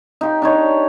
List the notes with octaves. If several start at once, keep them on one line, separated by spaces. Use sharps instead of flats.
D#4 G4
D4 D#4 C#5